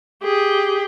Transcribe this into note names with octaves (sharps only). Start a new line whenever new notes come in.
G4 G#4